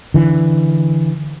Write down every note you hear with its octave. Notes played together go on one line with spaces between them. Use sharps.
D3 E3